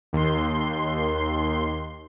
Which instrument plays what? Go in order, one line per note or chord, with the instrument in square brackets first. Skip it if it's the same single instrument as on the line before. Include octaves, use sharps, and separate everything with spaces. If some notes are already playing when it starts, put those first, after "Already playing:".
[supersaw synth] D#2 C6